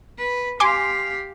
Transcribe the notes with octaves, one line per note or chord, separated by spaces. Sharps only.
B4
G4 F5 G#5 C6 D6